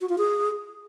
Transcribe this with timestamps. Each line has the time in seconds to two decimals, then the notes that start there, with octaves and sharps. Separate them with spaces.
0.01 F#4
0.09 F4
0.18 G#4